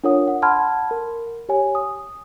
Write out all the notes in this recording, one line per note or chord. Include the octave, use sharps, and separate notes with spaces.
D4 F4 A#4 C#5 F#5 D#6
F#5
F#5 A5 B5 C6 F6 G#6
A#4
G4 C#5 G#5
D#6